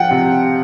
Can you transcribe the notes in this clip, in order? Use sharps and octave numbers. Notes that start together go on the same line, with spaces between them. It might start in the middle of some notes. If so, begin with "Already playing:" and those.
Already playing: F3 F#5 G5
C3